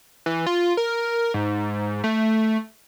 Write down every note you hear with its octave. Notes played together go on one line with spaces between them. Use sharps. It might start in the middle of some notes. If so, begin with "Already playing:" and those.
E3
F4
A#4
G#2
A3